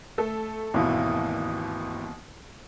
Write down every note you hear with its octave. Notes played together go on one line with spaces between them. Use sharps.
A3 A4
G#1 D#2 B2 E3 E4